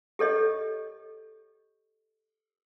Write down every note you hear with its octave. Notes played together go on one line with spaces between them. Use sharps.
G4 A4 C#5 D#5